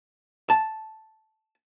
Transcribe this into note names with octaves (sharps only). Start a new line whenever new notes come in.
A5